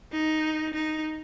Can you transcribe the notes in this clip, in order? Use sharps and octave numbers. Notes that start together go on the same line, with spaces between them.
D#4
D#4